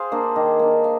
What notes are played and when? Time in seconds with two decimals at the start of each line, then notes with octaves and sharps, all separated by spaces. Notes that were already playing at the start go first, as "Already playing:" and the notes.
Already playing: G#4 C5 F5
0.12 A#3 D4
0.36 D#3 D#5
0.59 A#3 D4
0.84 F5